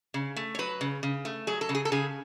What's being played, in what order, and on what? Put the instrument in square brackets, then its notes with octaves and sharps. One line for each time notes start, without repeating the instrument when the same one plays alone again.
[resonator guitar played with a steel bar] C#3
A3
C#5
F#3 B4
C#3
C#3
A3
F#3 G#4
A4
C#3
G#4
A4
C#3 G#4